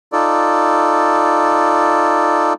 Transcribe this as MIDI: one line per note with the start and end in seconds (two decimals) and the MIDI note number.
0.13 2.53 63
0.13 2.53 65
0.13 2.53 69
0.13 2.53 74